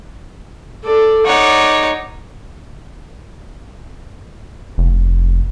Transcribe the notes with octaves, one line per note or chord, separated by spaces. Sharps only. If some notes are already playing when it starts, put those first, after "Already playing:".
A4 D5
D#4 C#5 D5 F#5
F1